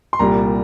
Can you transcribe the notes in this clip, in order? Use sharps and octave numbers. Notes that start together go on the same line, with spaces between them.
C6
C2 A#2 G3 A#5